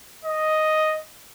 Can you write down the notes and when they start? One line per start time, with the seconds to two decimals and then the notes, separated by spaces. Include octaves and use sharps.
0.25 D#5